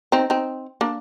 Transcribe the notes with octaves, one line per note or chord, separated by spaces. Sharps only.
C4 D#4
C4 D#4
A#3 D4